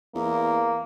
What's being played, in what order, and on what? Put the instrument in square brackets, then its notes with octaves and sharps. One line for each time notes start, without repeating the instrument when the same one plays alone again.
[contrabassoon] E2 [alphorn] A#3